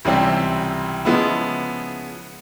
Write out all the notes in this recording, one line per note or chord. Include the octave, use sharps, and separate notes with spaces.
C#2 C3 E3 G3 C4
C#3 F3 G#3 B3 E4